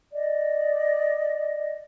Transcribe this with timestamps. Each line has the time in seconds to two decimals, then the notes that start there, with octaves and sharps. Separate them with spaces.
0.12 D5 D#5